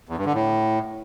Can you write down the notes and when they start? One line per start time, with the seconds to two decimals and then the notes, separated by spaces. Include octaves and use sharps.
0.09 E2
0.17 G2
0.25 D3
0.34 A2